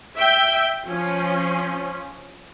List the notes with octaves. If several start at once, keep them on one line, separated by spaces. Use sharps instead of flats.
E5 G5
F3 C#4